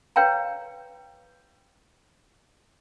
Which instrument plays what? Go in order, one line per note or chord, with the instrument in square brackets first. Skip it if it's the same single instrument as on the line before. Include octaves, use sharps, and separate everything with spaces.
[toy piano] B4 C#5 F5 G5 A#5